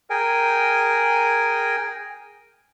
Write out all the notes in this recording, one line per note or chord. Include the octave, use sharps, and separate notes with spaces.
G#4 A#4 G5 G#5